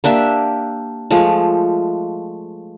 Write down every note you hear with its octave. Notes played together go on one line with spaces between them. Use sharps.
A#3 D4 G4 E5
F3 G#3 A3